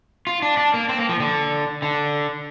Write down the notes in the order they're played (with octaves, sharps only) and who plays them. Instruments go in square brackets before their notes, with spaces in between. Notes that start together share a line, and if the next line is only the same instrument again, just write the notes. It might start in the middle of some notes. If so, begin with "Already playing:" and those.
[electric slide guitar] F4
D4
D4
A#3
C4
A#3
F3
D3
D3